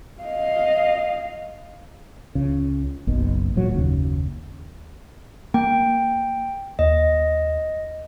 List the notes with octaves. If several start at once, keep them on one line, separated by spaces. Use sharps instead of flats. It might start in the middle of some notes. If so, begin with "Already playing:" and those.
D#5 F5
C#2 C#3
F#1 B1 B2
D1 A#2 F#3
F#1 D#2 C#3
A#3 G5
D#2 D#5